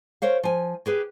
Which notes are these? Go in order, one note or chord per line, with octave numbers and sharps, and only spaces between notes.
A#4 C5 C#5 F5
F3 G#5
G4 G#4 B4